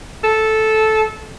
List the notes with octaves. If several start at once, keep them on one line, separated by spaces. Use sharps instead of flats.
A4